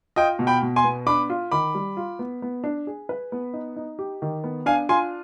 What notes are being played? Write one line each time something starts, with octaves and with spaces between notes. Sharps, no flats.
F4 D#5 G5
B2
G5 B5
B2
G#5 C6
B3
D4 B5 D6
F4
D#3 B5 D6
G3
F4
B3
B3
D4
G#4
B4
B3
D#4
D#4
G4
D#3
B3
D4 F5 G#5
F4 G#5 C6